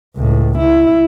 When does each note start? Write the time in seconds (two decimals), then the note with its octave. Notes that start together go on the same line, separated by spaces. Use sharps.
0.16 C#2 A2
0.58 E4